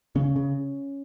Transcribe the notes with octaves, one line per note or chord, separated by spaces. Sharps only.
C#3 C#4
C#3